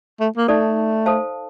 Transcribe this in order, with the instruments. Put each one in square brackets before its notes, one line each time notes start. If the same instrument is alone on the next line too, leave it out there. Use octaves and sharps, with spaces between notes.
[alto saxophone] A3
A#3
[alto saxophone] A3 [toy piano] D#4 A4 D5
[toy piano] A4 C5 F5 A5